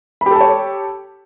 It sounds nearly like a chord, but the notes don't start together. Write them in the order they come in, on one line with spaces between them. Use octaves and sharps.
B5 G4 A4 A5 C#5